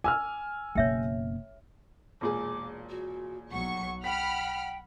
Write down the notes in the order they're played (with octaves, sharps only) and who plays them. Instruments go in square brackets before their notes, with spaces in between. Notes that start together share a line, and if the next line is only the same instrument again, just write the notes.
[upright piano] G#5 E6 F6 [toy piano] D6
[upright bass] F#1 B2 [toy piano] C#5 E5 G5
[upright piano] E1 A#2 G#4 [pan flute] D6
[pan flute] F#4
[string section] B1 F#3 C#6 [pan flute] F#5
[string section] F#5 B5 F6 [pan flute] G5 [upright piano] B6